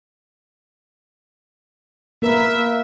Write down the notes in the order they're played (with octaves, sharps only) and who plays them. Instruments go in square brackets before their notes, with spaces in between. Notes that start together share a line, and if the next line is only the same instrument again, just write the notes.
[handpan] A#3 A#4 B4 [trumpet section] E5